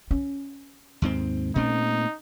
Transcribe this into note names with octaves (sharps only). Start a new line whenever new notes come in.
C#4
D#2 G#2 C4
A#2 A3 C4 C#4 D#4